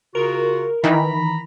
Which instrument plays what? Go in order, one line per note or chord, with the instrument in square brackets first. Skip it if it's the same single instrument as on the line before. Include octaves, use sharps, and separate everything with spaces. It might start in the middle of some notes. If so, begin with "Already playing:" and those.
[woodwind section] C#3 F4 F#4 [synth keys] A#4
[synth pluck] D#3 E3 [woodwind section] A#5 B5